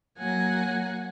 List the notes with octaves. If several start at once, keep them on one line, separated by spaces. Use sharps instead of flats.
F#3 A#3 F#5 G#5